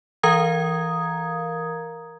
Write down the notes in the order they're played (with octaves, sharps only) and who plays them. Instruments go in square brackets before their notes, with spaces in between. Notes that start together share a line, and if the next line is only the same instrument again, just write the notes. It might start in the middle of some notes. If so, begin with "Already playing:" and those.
[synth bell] E3 A#4 F5 A#5 D#6 G#6